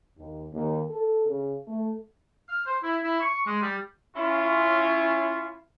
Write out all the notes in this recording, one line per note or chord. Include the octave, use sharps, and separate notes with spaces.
D#2
D#2
A4
C#3
A3
F6
C5
E4
E4
C#6
G#3
G3
C#4 E4 F4